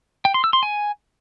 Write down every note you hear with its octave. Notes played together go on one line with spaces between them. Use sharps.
G5
C6
E6
C6
G#5